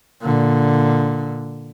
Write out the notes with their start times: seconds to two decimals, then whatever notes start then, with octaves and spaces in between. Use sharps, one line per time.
0.21 A#2 D3